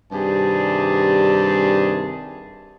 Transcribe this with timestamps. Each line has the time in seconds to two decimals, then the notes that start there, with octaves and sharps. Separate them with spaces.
0.11 G2 C3 D#3 G3 G#4 A5